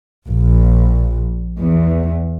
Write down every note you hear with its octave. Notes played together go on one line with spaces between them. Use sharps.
A#1
E2